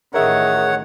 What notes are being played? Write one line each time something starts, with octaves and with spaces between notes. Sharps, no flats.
A1 D#3 G#4 A#4 C#5 E5 F#5